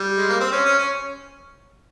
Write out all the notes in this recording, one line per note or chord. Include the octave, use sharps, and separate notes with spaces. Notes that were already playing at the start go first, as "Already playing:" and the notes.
Already playing: G3
G#3
A#3
C4
C#4
C#4
C#4